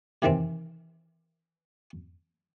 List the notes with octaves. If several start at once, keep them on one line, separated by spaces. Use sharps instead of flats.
C3 D#3 E3 C4